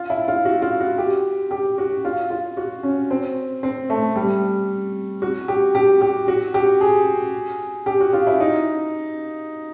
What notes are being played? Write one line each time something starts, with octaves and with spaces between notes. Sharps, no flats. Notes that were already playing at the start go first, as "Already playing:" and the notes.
Already playing: F4
E4
F4
F#4
F4
F#4
G4
G4
F#4
F4
F4
F#4
C#4
C4
C4
A3
G3
F#4
G4
G4
G4
F#4
G4
G#4
G4
F#4
F4
E4
D#4